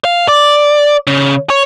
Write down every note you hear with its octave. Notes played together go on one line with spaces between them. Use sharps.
F5
D5
C#3
C#5